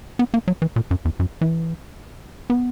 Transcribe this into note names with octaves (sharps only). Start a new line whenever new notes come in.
B3
A#3
F#3
E3
A#2
F#2
E2
F#2
E3
B3